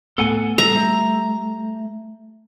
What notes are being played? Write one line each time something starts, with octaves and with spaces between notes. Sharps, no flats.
A2 A3 B3 A4 F#5 G#5
G3 A4 A#5
A3